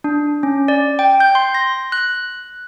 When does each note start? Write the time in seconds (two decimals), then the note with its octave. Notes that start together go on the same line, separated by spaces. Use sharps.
0.04 D4
0.43 C#4
0.68 D5
0.99 G5
1.20 G6
1.35 C6
1.55 A#6
1.92 F#6